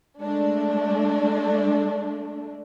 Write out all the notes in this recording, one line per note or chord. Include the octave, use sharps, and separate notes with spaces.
G#3 A3 D4